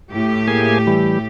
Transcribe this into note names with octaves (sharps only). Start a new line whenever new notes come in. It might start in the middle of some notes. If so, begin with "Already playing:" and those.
A2 G4
A#3 G#4 G#5
E3 G3